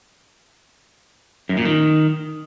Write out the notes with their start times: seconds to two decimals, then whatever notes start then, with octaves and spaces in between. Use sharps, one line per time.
1.49 F#2
1.57 A#2
1.65 D#3